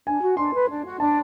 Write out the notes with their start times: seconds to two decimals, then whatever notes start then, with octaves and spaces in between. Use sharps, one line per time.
0.07 D4 G#5
0.22 F#4
0.37 D4 C6
0.53 B4
0.69 D4
0.85 F#4
1.00 D4 A5